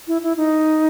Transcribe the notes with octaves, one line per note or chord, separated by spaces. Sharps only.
E4
E4
D#4